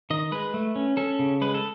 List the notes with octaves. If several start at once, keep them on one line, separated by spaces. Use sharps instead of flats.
D#3 D#5
G#3 B4
A3
C#4
C#4 A4
C#3
G#3 B4
A4